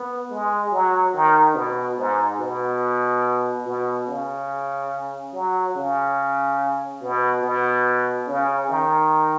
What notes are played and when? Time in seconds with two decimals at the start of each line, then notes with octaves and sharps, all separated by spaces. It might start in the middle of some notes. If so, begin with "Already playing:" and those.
Already playing: B3
0.30 G#3
0.72 F#3
1.14 D#3
1.55 B2
1.97 G#2
2.39 B2
3.66 B2
4.08 C#3
5.33 F#3
5.75 C#3
7.01 B2
7.42 B2
8.26 C#3
8.69 D#3